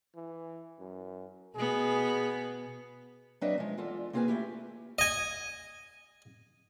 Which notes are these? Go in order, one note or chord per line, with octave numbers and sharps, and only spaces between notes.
E3
F#2
B2 B3 G#4
F#3 C4 D4 B4 D#5 E5
F3 G#3
E2 F4 A4
A#3 C4 F4 G#4 B4 G#5
A3 E4 G4
D#5 G#5